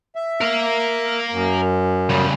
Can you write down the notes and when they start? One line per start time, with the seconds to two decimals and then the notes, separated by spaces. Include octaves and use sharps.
0.16 E5
0.41 A#4 F5
1.32 F#2
2.10 C#3 G3